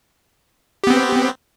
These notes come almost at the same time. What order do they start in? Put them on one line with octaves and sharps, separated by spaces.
G4 B3 C4